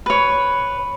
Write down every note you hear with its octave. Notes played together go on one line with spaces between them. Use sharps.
B4 C#5